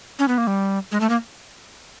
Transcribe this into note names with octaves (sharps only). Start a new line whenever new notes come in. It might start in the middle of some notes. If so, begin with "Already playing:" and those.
C#4
B3
A#3
G3
G#3
A3
A#3